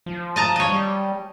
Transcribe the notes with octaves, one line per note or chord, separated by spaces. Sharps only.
F3
D#5 A5 A#5
C#5 D#5
G3